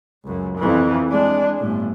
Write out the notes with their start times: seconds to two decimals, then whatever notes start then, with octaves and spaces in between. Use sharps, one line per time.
0.25 C#2 F#2
0.58 F2 E3
1.09 G#3 D4
1.59 G1 A2